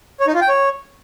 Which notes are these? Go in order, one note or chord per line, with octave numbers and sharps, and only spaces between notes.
C#5
D#4
F4
G5
C#5